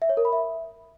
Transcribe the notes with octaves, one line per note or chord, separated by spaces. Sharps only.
E5
C#5
A#4
B5
E5